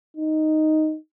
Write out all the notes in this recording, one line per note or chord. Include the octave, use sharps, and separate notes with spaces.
D#4